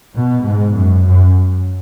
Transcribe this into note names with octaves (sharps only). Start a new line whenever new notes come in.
B2
G#2
F#2
F#2